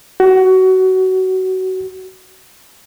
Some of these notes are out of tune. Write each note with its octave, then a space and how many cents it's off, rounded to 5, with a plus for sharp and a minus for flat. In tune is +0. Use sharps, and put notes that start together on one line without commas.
F#4 +20